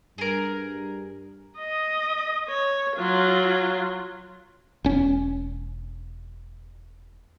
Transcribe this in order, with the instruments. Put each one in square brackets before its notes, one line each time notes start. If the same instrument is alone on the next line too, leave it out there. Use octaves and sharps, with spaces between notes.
[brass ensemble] G2 [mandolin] G#4 A#4
[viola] D#5
C#5
F#3 F4
[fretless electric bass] E1 C#4